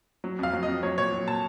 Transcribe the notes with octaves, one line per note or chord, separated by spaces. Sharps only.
F#3
F2 F5
F#3
D#5
F2
F#3 C#5
A#2 C#5
F#3
A#2 A5